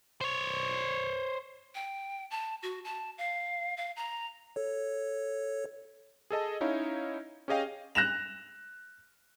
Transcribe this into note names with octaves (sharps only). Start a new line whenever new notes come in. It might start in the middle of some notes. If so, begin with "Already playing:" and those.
C5 C#5
G5
A5
F#4
A5
F5
F5
A#5
A4 C#5
G#4 A4 D#5 A5
C#4 D#4 E4 C#5 F5
C#4 G4 G#4 D#5 F5 G5
F#6 A#6 E7 F7